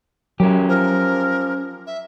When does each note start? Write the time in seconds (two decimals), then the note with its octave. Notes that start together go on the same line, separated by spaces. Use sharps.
0.40 F#2 F#3 C#4 G4
0.69 F3 A#4
1.87 E5